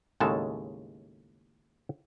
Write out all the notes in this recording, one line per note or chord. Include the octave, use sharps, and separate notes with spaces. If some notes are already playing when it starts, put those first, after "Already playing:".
D#2 A2 C#3 G#3 A4 A5